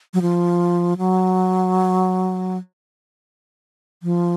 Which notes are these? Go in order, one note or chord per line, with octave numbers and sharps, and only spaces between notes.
F#3
F3
F#3
F3